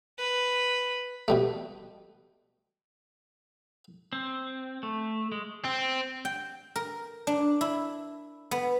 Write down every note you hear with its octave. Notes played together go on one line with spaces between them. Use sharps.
B4
B2 G3 A3
C4
A3
G#3
C4
G5
A#4
D4
E4
B3